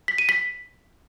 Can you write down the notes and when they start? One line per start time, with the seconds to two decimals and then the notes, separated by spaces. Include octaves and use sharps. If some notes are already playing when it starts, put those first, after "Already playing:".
0.08 B6
0.18 D#7
0.29 B6